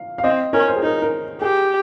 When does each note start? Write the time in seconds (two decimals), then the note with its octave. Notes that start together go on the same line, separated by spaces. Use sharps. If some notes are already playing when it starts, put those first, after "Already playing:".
Already playing: F5
0.18 F5
0.24 C4 D#5
0.53 C#4 A#4
0.68 C5
0.76 G#4
0.83 D#4 A#4
1.02 A#4
1.42 G4 G#4